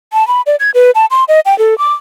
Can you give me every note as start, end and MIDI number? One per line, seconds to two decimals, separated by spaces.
0.13 0.26 81
0.28 0.41 83
0.46 0.56 74
0.60 0.71 92
0.74 0.91 71
0.95 1.06 81
1.11 1.24 84
1.28 1.40 75
1.46 1.57 79
1.59 1.77 69
1.78 1.93 86